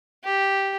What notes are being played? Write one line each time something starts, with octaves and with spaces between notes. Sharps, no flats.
G4